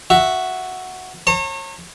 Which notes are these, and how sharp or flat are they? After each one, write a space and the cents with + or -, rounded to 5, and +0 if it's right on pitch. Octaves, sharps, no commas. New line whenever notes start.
F#4 +0 E5 +0
C#5 -35 A#5 -45